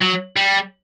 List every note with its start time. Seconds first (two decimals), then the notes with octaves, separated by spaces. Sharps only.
0.02 F#3
0.37 G3